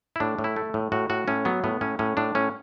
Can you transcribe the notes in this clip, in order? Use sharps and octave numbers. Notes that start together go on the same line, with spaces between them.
E4
A2 D4
A2
E4
A3
A2
A2 F#4
A2 F#4
A2 C#4
F#3 B3
A2 B3
A2 C#4
A2 C#4
A2 D4
A2 C#4